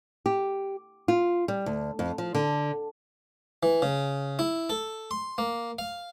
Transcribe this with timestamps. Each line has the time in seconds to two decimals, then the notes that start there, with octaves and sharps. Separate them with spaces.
0.26 G4
1.08 F4
1.48 G3
1.66 D2
1.99 F2
2.18 F3
2.35 D3
3.63 E3
3.82 C#3
4.39 E4
4.70 A4
5.11 C6
5.38 A#3
5.79 F5